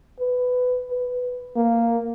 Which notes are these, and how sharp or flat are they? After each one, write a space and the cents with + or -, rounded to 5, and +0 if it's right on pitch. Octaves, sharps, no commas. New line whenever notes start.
B4 +15
B4 +5
A#3 -5